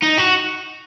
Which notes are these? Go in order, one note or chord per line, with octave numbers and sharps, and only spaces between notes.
D#4
F#4